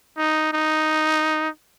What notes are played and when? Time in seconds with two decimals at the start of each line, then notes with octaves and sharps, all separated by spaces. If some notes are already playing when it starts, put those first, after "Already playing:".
0.18 D#4
0.53 D#4